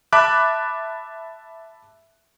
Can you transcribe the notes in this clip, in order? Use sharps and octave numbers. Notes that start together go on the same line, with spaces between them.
E5 A5 B5 D6 F#6